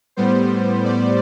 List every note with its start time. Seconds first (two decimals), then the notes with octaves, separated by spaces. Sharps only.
0.16 A2 G3 B3 C5
0.85 D5